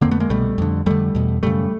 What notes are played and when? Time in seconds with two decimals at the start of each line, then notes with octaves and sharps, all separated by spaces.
0.01 F2 D3 A#3 C4
0.11 A3 B3
0.20 G#3 A#3
0.30 C2 B2 G3 A3
0.58 F2 D3
0.86 F2 D3 G3 A3
1.15 E2 B2
1.43 F#2 C#3 G3 A3